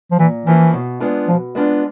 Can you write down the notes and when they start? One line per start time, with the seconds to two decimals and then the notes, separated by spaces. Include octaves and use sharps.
0.11 F3
0.19 A#2 E3
0.46 E3 F3 A#3 C#4 E4
0.73 B2
1.00 G#3 B3 D4 F4
1.28 B2 F3
1.55 G#3 B3 D4 F4